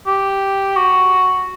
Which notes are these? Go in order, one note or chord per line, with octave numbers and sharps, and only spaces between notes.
G4
F#4